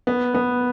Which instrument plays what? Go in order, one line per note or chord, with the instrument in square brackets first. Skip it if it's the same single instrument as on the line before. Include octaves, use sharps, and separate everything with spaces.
[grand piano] B3
B3